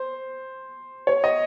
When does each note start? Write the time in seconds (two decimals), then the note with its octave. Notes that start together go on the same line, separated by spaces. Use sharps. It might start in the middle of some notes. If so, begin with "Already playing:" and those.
Already playing: C5
1.07 C#5
1.24 D#5